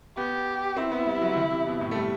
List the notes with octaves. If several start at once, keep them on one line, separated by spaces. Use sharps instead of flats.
B3 G4
C4 E4
B3
G3
F#3
D#3
C3
B2
A2
A3
G3